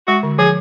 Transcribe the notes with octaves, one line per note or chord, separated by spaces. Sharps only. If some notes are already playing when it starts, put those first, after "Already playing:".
G#3 F#4
D3
F3 G#4